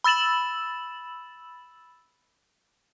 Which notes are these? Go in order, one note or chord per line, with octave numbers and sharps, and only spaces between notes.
B5 E6 A6 E7 F#7